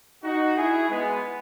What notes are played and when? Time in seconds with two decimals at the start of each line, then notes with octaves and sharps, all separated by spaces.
0.23 D#4 F#4
0.57 E4 G#4
0.90 G#3 B3